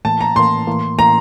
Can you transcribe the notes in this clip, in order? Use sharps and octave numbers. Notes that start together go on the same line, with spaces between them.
A2 E3 A#3 A5
A#5
A2 E3 A#3 C6
A2 E3 A#3
A2 E3 A#3 A#5